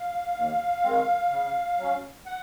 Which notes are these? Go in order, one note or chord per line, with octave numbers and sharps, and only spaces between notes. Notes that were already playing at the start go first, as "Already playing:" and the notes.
Already playing: F5
D#2
D#3 G#3 C4
C#3
F#3 C#4
F#5